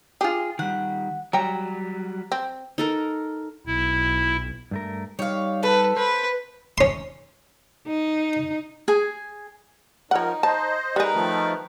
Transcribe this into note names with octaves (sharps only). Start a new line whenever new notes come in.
F4 G4 G#4
D#3 G3 F#5
F#3 G3 C#5 G5 A#5
C4
D#4 A4 A#4
B1 E4
G2 A3 A#4
G3 D#4 C#5 F5
A4 B4
B4 C5
C#4 C6
D#4
G#4 G#5
F3 D#4 A#4 C#5 F#5
C5 D#5 A5
G3 D#4 G#4 A#4 B4
D#3 F3 A3